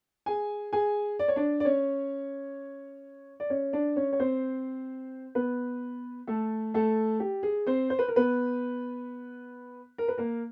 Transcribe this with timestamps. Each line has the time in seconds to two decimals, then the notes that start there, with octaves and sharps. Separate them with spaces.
0.26 G#4 G#5
0.73 G#4 G#5
1.19 D5
1.28 C#5
1.36 D4 D5
1.60 D5
1.65 C#4 C#5
3.40 D5
3.50 C#4 C#5
3.73 D4 D5
3.96 C#4 C#5
4.13 C#5
4.20 C4 C5
5.35 B3 B4
6.27 A3 A4
6.74 A3 A4
7.20 G4
7.43 G#4
7.67 C4 C5
7.90 C5
7.99 B4
8.08 A#4
8.16 B3 B4
9.98 A#4
10.08 B4
10.18 A#3 A#4